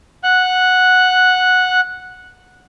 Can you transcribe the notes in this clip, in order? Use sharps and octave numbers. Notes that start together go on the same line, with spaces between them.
F#5 F#6